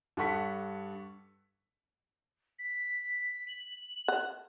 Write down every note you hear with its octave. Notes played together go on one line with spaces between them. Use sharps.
G2 D4 A4 F#5 C#6 B6
B6
F#7
F#5